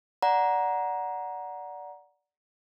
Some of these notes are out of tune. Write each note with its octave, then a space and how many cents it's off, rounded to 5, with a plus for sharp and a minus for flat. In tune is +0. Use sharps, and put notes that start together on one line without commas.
D5 -10 F#5 -5 A#5 +15